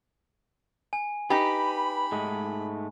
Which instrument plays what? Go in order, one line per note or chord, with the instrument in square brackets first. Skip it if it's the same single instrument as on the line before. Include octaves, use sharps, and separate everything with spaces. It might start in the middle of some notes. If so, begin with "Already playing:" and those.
[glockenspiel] G#5
[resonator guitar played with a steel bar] D#4 G4 [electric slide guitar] B4 [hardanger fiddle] B5
[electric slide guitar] G#2 G#3 A3